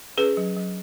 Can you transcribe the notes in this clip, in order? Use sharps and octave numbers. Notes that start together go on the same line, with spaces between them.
C#4 G#4 B4
F#3
F#3